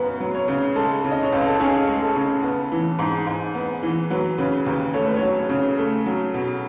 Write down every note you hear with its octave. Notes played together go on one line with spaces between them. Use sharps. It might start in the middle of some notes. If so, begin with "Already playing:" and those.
Already playing: F#2 C#3 B3 B4
F#3
C#5
C#3
G#3 A4
C#3
D#5
C#5
C#2 B4
A4
C#4 G#4
G#3
A4
C#3
B3
E3
G#2
G#2
B3
E3
F#3 B4
C#3 B4
D#2 B4
A3 C#5
B4
C#5
F#3
C#3
A3
F#3
B2